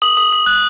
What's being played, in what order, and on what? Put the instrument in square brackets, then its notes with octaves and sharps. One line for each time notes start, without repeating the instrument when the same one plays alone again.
[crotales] D#6 F#7
D#6
D#6
F#6